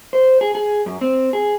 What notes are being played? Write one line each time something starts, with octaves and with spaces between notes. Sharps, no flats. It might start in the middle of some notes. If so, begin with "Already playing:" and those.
C5
G#4
G#4
F#2
C4
G#4